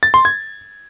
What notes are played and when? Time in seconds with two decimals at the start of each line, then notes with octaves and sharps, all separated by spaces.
0.03 A6
0.14 C6
0.25 G#6